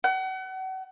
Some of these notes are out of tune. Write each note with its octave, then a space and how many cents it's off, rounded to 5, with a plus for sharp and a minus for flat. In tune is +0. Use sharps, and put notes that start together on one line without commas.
F#5 +35